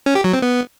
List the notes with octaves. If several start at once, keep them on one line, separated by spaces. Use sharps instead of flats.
C#4
G4
F#3
C4
B3